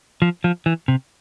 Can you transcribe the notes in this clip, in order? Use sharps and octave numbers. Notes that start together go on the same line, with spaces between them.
F3
F3
E3
C3